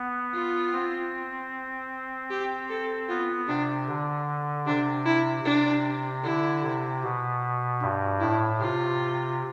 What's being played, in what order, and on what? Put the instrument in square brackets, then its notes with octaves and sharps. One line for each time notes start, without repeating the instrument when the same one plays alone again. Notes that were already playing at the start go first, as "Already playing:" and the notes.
Already playing: [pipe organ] B3
[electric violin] F4
[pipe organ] C4
[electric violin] G4
A4
[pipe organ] B3 [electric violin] F4
[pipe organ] C3 [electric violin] D4
[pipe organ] D3
[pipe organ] C3 [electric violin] D4
[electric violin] E4
[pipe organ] C3 [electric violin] D4
[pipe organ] D3 [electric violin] E4
[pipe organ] C3
B2
G2
[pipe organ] A2 [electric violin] E4
[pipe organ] C3 [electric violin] F4